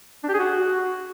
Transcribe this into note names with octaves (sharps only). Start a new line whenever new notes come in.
D4
G4
G#4
F#4